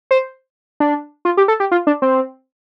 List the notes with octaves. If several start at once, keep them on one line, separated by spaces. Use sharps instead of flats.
C5
D4
F4
G4
A4
G4
F4
D4
C4